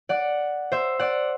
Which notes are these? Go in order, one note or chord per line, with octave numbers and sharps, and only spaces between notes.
D5 F#5
C5 E5
D5 F#5